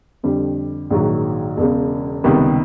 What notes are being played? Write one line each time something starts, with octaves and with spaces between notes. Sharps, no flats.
F2 D3 G3
A#1 G#2 D#3 F#3
E1 E2 C#3
C#2 C3 D#3 G3 B3